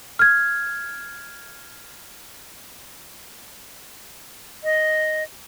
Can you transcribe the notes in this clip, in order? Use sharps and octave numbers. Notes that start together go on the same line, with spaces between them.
F6 G#6
D#5